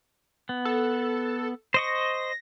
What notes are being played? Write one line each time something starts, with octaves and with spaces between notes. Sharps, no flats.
B3
A4
C5 D#5 C#6 A#6